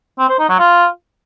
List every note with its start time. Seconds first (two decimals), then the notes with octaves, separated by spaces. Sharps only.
0.19 C4
0.29 C5
0.39 D#4
0.49 F#3
0.59 F4